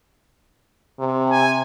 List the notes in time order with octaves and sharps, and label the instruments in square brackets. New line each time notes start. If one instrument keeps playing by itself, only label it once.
[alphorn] C3
[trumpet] G#5